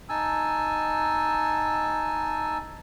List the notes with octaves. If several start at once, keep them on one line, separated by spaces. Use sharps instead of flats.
D#4 G#5 A5 E6